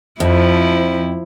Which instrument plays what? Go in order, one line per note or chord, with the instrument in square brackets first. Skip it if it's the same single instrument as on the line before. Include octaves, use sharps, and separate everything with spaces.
[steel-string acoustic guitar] F2 [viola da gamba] F3 E4